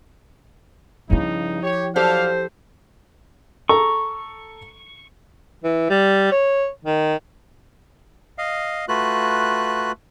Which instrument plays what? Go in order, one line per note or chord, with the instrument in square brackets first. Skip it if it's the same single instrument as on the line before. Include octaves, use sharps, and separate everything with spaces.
[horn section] G2 C#3 D#4 [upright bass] F3 E4
[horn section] G4 C#5
[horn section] F#3 D5 F5 [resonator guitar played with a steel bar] G4 A4 [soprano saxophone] C5
[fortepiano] A4 A#5 [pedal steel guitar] C#6
[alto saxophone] E3
G3
C#5
D#3
[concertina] D#5 F5
A3 F4 F#4 B4 F#6